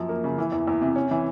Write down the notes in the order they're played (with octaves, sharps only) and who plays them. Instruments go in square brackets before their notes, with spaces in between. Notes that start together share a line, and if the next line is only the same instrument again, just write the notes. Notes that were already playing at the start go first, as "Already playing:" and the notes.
Already playing: [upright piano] F#2 F3
A#3
C#3
E3
E2
E2
C3
C#4
E3